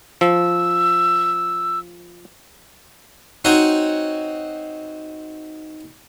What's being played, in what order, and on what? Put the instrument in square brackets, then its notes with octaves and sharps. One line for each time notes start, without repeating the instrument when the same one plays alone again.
[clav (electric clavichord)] F3 [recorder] E6
[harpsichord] C4 D#4 F#4 C5 C#5